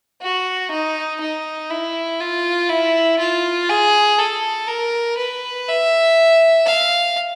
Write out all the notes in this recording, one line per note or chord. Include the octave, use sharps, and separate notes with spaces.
F#4
D#4
D#4
E4
F4
E4
F4
G#4
A4
A#4
B4
E5
F5